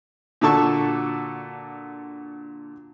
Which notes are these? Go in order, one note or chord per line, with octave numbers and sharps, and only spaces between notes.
A#2 D3 F#4 A4 A5 C#6